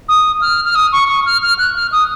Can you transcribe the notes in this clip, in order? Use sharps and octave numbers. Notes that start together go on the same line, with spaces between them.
D#6
F6
F6
D#6
C#6
C#6
F6
F6
F#6
F6
D#6